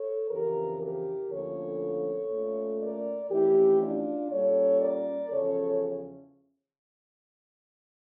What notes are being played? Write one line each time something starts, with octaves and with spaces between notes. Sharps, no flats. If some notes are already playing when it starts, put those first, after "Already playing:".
Already playing: A4 C#5
F2 C#3 E3 G4 A#4
G4 A#4
D2 D3 F3 A#3 C#4 A4 C#5
A#2 A3 C#4
A#4 D5
F2 E3 A3 C#4 E4 G4
D4 F4
A#2 G3 A#3 C#4 A4 C#5
A#4 D5
E2 C#3 F3 C#4 A4 C#5